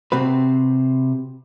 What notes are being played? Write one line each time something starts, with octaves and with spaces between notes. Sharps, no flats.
C3 C4 F#4 B4